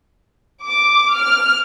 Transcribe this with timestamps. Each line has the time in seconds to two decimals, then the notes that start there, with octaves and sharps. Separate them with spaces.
0.65 D6
1.17 F6